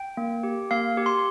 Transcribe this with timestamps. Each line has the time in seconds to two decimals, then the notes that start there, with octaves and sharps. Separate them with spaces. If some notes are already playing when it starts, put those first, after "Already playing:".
Already playing: G5
0.17 A#3
0.43 G4
0.71 A#3 F5
0.97 G4
1.06 C6